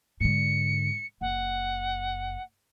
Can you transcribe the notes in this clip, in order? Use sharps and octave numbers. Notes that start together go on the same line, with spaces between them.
G#2 D3 C#7
F#1 F#5